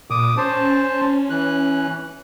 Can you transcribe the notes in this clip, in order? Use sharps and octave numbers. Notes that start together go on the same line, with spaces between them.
A#2 D6 D#6
C#4 C5 A5
E3 F#6